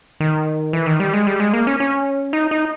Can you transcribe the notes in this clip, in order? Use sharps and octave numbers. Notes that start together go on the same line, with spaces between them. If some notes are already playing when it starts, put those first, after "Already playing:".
D#3
E3
D#3
G3
G#3
G3
G#3
A#3
C#4
C#4
D#4
D#4